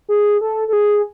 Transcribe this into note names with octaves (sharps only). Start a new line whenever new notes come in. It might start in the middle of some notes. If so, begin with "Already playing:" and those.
G#4
A4
A4
G#4